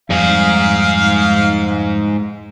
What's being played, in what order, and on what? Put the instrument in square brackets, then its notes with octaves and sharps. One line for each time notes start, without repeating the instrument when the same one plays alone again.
[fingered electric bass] F2 F3 G3 [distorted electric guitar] G#2 G#4 [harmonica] F5